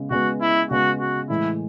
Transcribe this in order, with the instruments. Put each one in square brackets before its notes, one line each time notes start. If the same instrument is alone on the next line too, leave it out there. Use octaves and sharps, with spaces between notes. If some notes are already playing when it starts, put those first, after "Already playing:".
Already playing: [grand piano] C#3 G#3 B3
[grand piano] C#3 G#3 B3 [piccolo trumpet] F#4
[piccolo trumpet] E4
[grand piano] C#3 G#3 B3 [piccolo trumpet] F#4
[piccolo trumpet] F#4
[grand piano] A2 E3 G#3 [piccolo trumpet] E4